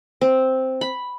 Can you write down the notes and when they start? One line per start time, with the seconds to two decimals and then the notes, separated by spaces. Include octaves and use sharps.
0.21 C4
0.81 B5